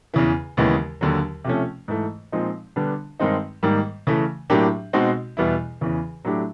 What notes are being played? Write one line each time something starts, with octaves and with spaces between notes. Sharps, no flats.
E2 C#3 E3
D#2 C#3 E3 G#3 B3
D#2 D3 F#3
C3 F3 A3 C#4
G#2 E3 A3
A#2 F3 G#3 C4 D#4
D3 G3 B3 D4
G2 D#3 G#3 C4 D#4
G#2 D#3 G3 A#3
C#3 E3 A3
A2 F#3 A#3 D4 G4
B2 G#3 C4 D#4 F#4
E2 B2 G3 B3 E4
E2 C#3 E3
A2 F#3 A3 D4 G4